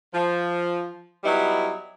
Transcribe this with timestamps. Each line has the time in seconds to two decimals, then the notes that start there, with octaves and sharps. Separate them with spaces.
0.14 F3
1.24 F#3 G3 B3 D#4 E4